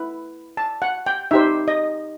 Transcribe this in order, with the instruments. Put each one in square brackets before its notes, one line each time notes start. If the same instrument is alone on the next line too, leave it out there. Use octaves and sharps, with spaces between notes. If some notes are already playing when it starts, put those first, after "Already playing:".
Already playing: [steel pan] E4 B4
A5
F#5
G5
D#4 G4 C5 E5
D#5